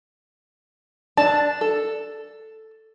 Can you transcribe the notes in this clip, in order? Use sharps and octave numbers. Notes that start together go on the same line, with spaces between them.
D4 A5
A4